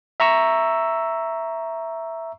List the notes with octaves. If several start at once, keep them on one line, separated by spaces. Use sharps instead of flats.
E5 A#5 C#6 E6